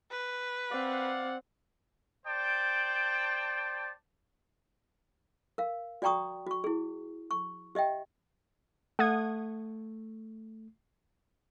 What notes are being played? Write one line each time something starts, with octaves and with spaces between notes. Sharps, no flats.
B4
C4 D5 F5 F#5
C5 D5 G5 A5
A#4 F5
F#4 D5 G5 A#5 C#6 D#6
F#4 C#6
E4 G#4
C#6
G4 D#5 E5 G5
A3 F#5 D#6 G#6